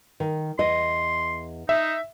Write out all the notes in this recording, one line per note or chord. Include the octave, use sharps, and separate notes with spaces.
D#3
E2 D#5 C6
D#4 E5